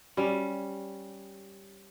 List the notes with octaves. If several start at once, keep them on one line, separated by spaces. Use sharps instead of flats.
G3 C#4